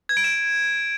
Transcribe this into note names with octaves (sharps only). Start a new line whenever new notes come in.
G#6
D7
E7